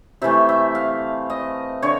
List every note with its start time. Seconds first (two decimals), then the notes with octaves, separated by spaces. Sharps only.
0.22 C3 E3 A3 E5
0.49 E5
0.75 F5
1.30 D#5
1.82 D3 C#5